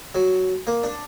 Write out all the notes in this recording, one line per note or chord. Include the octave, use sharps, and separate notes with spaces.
F#3
A#3
D4